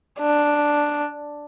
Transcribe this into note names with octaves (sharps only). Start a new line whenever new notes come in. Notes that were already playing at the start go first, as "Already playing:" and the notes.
D4